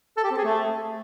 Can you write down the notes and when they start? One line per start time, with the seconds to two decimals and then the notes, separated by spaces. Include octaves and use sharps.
0.17 A4
0.24 G4
0.31 C4
0.38 G#4
0.44 A3